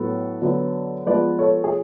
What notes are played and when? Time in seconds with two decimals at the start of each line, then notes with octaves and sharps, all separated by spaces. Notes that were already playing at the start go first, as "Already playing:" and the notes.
Already playing: A2 F#3 B3 A4 C#5
0.42 D3 F#3 B3
1.06 F3 G#3 B3 B4 D5
1.39 A4 C#5
1.64 G#4